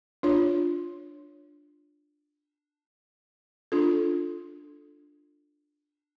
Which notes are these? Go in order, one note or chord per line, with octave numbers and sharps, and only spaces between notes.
D4 F4 C#5
D4 F4 A4